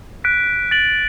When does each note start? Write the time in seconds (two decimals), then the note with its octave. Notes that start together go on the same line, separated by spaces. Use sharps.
0.24 F#6 B6 D7
0.71 A6 D7 F#7